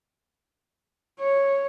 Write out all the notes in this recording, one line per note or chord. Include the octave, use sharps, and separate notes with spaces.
C#5